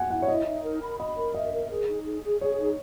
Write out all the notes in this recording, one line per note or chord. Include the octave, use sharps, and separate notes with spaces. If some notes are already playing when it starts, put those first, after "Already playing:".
Already playing: F#5 G#5
E4 F#5
C#5
D#5 E5
D#4
A#4
B5
D#5 B5
A#4
D#5 E5
A#4
G#4
D#4
G#4
G#4
G#4 C#5
D#4